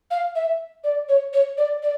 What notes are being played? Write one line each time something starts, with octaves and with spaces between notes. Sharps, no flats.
F5
E5
D5
C#5
C#5
D5
D5